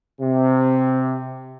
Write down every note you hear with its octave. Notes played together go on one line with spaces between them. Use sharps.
C3